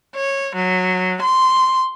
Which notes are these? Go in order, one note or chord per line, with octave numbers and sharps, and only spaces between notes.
C#5
F#3
C6